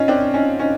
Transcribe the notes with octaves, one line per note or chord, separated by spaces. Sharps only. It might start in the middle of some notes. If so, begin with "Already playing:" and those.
Already playing: C#4 D#4 F4
C4 D4
C#4 D#4
C#4 D#4